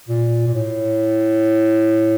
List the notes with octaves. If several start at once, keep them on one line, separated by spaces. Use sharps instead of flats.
A#2
A#2
A2